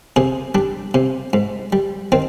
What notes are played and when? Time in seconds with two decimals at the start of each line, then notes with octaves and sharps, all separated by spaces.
0.16 C3 G#4
0.55 G3 D4
0.94 C3
1.33 G#2
1.73 G3
2.12 D#3 C4